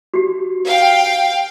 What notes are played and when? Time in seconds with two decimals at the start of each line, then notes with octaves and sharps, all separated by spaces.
0.14 F#4 G4
0.65 F5 G5